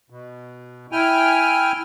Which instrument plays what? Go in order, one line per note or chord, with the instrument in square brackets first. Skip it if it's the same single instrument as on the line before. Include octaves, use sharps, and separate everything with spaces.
[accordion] B2
E4 G5 G#5 F6